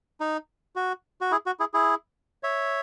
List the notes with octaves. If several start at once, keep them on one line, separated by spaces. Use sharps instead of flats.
D#4
F#4
F#4
E4 G#4
F#4
E4 G#4
E4 G#4
C#5 E5